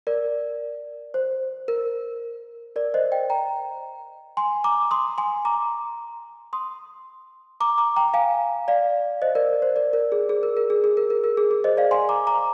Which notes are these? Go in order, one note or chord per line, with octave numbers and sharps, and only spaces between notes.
A#4 D5
C5
A#4
A#4 D5
C5 D#5
D#5 G5
G5 A#5
G#5 C6
A#5 D6
C6 D#6
G#5 C6
A#5 D6
C6 D#6
A#5 D6
A#5 D6
G5 A#5
F5 G#5
D5 F5
C5 D#5
A#4 D5
A#4
C5
A#4 D5
A#4
G#4
G#4
A#4
A#4
G#4
G#4
A#4
A#4
A#4
G#4
G#4
C5 D#5
D5 F5
G#5 C6
A#5 D6
A#5 D6